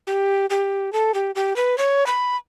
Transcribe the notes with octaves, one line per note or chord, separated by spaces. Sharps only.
G4
G4
A4
G4
G4
B4
C#5
B5